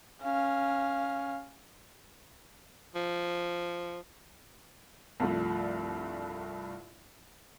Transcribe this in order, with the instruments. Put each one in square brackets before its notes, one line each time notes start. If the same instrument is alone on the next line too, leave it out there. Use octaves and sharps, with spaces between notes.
[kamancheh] C#4 F5
[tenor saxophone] F3
[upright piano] C2 G2 F3 A3